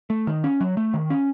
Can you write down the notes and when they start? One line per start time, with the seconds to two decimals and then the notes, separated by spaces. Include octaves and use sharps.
0.10 A3
0.27 D#3
0.44 C#4
0.61 F#3
0.77 A3
0.94 D#3
1.10 C#4